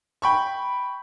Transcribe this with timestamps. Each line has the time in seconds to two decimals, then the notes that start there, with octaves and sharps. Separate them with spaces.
0.22 G5 B5 C#6